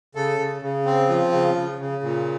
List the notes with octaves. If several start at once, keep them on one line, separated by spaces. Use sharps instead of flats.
C#3 A4
C#3
C#3
C4
F3 F4
C#3
C#3
C#3
A#2